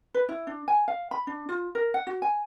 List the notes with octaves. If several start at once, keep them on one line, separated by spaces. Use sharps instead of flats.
B4
E4
D4
G#5
F5
B5
D4
F4
A#4
F#5
F#4
G#5